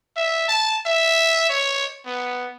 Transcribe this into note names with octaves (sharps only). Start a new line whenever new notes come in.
E5
A5
E5
C#5
B3